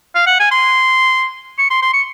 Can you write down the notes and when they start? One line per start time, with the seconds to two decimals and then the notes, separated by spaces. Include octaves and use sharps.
0.15 F5
0.26 F#5
0.40 G#5
0.51 C6
1.58 C#6
1.70 C6
1.82 C6
1.94 C#6